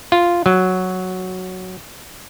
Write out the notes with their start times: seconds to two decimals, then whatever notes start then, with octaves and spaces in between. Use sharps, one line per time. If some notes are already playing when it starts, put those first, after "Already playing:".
0.12 F4
0.46 F#3